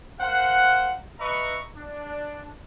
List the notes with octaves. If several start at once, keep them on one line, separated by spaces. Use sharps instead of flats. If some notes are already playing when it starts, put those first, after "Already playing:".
A#4 C5 F5 F#5
B4 D#5 E5 A#5 B5 C#6
D4